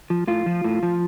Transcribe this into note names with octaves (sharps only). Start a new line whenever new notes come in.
F3
A2 F4
F3
A2
F3